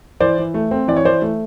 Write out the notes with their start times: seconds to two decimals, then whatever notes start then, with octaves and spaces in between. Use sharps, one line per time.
0.20 E3 C5 D5
0.38 E3
0.54 A3
0.71 C4
0.88 E3 D5
0.96 C#5
1.05 E3 C5 D5
1.22 A3